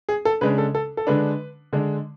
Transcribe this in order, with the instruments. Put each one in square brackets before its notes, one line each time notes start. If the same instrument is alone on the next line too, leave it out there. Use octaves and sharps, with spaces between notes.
[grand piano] G#4
A4
C#3 G#3 D4 B4
A4
A4
A4
D3 G#3 D4 B4
D3 G#3 D4